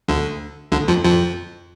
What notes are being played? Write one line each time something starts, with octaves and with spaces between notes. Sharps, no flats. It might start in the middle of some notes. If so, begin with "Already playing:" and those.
D2 D3
D2 D3
F2 F3
F2 F3